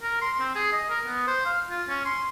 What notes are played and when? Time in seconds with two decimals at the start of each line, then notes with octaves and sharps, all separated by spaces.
0.02 A#4
0.22 C6
0.40 C4
0.56 G#4
0.73 D#5
0.90 A#4
1.06 B3
1.27 C5
1.46 F5
1.70 F4
1.89 C#4
2.06 C6